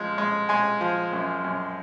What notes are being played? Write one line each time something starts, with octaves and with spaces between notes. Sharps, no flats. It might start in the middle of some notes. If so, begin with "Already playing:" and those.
Already playing: F3 G#3
G#3
G#3 G#5
F3
F#2
F#2